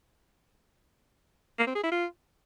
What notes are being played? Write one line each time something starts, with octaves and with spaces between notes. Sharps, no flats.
A#3
C4
G#4
E4
F4